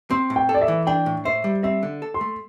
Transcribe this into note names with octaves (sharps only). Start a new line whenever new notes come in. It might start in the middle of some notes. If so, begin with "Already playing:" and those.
C4 C6
A2
G5
A4
D5
E5
E3
D4 G5
A2
C5 E5
G3
C4 E5
D3
A4
C6
A3